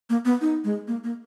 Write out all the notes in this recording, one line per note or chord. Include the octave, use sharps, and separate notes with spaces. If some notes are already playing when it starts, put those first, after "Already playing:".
A#3
B3
D#4
G#3
A#3
A#3